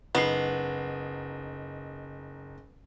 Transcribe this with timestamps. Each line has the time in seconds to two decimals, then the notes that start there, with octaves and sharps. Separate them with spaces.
0.15 F#1 B3 D#4 C7